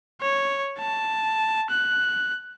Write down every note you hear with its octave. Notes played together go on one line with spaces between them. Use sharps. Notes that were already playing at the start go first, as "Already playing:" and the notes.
C#5
A5
F#6